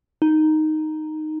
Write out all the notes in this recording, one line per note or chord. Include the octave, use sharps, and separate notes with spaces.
D#4